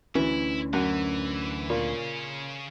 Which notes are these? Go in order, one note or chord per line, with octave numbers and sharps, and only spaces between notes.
D2 E3 C#4 E4
F#2 E3 F#5
A#2 C#3 C#5